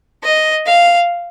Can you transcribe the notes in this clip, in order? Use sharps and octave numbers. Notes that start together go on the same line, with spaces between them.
D#5
F5